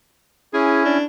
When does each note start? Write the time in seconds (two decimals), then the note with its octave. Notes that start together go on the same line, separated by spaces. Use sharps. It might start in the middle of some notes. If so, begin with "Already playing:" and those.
0.53 C#4 E4 G#4
0.85 D4